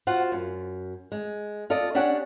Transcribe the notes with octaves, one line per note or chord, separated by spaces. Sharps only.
F4 F#4 C5 F#5
F#2
G#3
F4 A4 D5 D#5
C#4 D4 G4 C#5 F#5